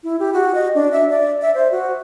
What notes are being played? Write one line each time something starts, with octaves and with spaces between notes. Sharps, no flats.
E4
G4
F#4
D#5
D4
E5
D5
E5
C5
F#4